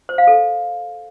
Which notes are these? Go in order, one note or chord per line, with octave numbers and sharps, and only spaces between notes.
C5
F5
A4